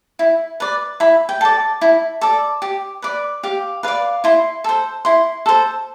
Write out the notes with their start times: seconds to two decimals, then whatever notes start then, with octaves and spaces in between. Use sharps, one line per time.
0.19 E4
0.60 B4 D5
1.00 E4 B5
1.29 G5
1.41 A4 D5 A5
1.81 E4
2.21 A4 D5
2.62 G4
3.02 B4 D5
3.43 G4 F5
3.83 B4 D5 F5
4.24 E4 C6
4.64 A4 C5
5.05 E4 C6
5.46 A4 C5